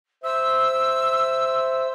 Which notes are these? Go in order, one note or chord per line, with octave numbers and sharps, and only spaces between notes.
C5 E5 E6